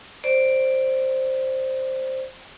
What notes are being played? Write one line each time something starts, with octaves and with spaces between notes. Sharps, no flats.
C5 D5